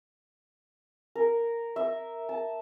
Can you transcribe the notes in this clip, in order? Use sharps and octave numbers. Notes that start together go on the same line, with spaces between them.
A#4
E5
A5